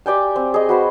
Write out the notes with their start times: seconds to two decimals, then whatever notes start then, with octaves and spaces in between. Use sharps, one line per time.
0.06 G4 D5 G5 G#5
0.36 C4
0.54 G#4 D#5
0.69 F#4 B4 C5